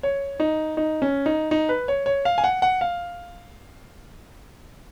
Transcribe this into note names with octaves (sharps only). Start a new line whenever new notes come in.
C#5
D#4
D#4
C#4
D#4
D#4
B4
C#5
C#5
F5
G#5
F#5
F#5
F5